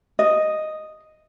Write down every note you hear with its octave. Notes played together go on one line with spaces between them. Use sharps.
D#5